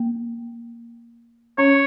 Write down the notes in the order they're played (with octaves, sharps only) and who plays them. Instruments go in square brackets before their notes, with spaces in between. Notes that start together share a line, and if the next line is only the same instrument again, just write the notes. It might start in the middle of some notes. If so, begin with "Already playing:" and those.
Already playing: [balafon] A#3
[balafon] C#4 [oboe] C#5